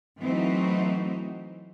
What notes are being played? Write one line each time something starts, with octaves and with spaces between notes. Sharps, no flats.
E3 F#3 A3 C4 D#4 F#4